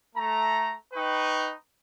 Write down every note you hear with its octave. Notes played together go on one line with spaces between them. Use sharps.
A3 A#5
D#4 B4 G5 C#6